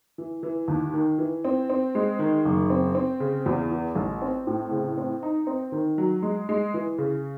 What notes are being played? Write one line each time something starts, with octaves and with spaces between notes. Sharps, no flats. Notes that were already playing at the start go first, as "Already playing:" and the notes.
E3
E3
D#2
D#3
E3
C4
C4
G#3
D#3
F#1
C4
C4
C#3
E2
E3
A1
C4
A2
C#3
C4
D#4
C4
D#3
F#3
G#3
G#3
E3
C#3